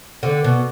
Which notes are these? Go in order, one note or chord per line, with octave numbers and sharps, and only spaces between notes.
D3
B2